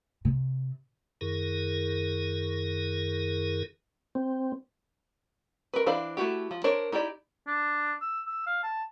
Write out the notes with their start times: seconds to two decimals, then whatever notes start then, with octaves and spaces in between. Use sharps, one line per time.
0.25 C3
1.21 F#2 D#3 E4 G#4 A#4
4.15 C4
5.74 A#4 B4
5.86 E3 D4 C5 F5 B5
6.17 A3 E4 F#4 G4
6.51 F3
6.64 D4 A#4 C5 C#5
6.92 D#4 E4 G4 D5
7.47 D4
8.02 E6
8.27 E6
8.47 F5
8.64 A5